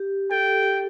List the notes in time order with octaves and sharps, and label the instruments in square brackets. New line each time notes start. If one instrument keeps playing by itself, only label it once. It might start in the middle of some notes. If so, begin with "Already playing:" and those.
Already playing: [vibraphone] G4
[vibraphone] A4 [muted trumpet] G5
[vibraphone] G4